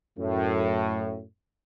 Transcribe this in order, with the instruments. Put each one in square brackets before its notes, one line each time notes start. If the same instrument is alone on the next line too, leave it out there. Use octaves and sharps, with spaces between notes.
[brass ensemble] F#2 A2